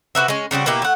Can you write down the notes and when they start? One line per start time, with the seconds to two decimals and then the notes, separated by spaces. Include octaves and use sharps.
0.15 C3 F#4 B4 E5
0.28 G#3 C#4
0.51 C#3 G3 C4 F#4
0.66 B2 A#3 E4 G4
0.82 A3 F#5